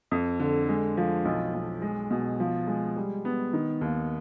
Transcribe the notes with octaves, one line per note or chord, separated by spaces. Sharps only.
F2
D3
G#3
F3
B1
B1
G#3
B2
F3
G#3
G3
B3
D#3
D#2